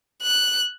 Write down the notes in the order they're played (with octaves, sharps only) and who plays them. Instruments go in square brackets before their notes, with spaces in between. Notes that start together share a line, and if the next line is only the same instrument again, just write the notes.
[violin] F#6